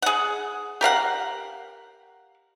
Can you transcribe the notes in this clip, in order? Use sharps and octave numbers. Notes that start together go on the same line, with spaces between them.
G#4 F#5
G4 A#4 F5 F#5